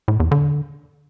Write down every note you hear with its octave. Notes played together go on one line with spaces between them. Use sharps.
A2
E2
D3